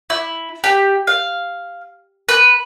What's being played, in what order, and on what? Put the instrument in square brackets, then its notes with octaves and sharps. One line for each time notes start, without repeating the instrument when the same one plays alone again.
[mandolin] E4
G4
F5
B4